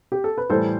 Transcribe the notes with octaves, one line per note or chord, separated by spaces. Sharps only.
G4
A4
B4
A2 E3 G3 A4 C5